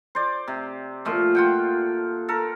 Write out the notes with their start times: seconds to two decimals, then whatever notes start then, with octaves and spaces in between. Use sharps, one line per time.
0.15 C5 D5
0.48 C3
1.05 A#2 F3 A3
1.35 F4 F#5 G5
2.28 A4 A#4